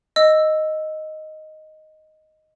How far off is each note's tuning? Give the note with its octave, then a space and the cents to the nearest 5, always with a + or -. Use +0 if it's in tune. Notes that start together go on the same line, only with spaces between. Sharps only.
D#5 +0 E6 +0